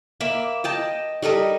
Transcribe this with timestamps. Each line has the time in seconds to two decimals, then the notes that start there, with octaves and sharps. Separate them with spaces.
0.20 A#3 E5 B5 D6
0.64 D#5 G5 A5
1.22 G3 A4 A#4 D#5